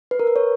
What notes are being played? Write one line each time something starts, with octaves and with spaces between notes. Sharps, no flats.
B4
A#4
B4
C#5